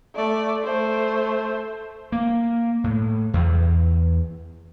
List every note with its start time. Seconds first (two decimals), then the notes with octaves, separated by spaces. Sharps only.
0.15 A3 D5
0.64 A3 C5
2.12 A#3
2.84 A2
3.34 E2